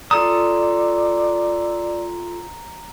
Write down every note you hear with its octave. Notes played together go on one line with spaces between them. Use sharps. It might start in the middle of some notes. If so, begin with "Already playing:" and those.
F4 A4 D5 A#5 D#6